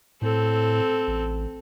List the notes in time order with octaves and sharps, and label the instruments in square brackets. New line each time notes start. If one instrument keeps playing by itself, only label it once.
[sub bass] A2 [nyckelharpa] C4 A4
[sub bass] A1